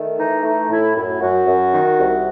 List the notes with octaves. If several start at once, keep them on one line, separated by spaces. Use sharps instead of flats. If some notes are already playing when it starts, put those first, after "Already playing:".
Already playing: D#3 A3
E3 D#4
A3 D#4
A2 E4
F#2 E4
F#2 F#4
F#2
D#3
C2